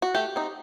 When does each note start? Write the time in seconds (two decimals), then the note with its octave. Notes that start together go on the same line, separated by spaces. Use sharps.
0.02 F#4
0.15 A3 G4
0.36 C4 D#4